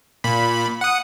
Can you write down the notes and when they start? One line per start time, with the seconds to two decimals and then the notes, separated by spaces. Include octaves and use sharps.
0.24 A#2 B5
0.81 F#5 D#6